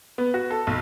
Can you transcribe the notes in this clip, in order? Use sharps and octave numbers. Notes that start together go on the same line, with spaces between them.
B3
F#4
A4
B1